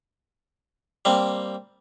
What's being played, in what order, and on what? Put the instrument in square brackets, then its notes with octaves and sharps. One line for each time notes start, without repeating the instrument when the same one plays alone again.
[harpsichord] G3 A#3 C4